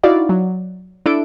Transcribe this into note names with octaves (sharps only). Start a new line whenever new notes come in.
D#4 E4 F#4 D5 F5
F#3
D4 E4 A4 D7